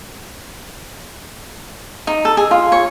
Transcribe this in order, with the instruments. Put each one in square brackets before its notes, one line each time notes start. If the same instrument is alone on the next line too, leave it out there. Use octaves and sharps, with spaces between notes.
[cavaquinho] D#4
A4
G#4
F4
C#5